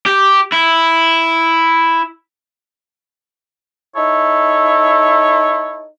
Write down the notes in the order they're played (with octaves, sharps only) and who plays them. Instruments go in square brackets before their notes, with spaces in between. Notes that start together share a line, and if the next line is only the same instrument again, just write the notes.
[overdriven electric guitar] G4
E4
[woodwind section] D#4 E4 A4 C#5